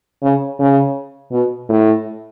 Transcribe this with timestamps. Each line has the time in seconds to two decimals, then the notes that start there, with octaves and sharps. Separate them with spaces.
0.23 C#3
0.59 C#3
1.32 B2
1.69 A2